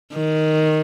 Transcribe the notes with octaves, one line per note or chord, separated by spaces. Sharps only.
D#3